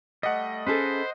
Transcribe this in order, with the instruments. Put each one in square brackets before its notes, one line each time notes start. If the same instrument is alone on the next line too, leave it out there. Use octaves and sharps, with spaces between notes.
[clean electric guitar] G3 A3 [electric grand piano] D#5 F#5
[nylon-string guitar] C#4 G#4 A4 [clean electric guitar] B4 E5 [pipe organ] C5